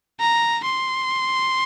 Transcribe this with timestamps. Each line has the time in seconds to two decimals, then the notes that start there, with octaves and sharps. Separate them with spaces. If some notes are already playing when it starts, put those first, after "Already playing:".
0.20 A#5
0.64 C6